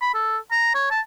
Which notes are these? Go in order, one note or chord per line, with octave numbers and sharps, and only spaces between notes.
B5
A4
A#5
C#5
A5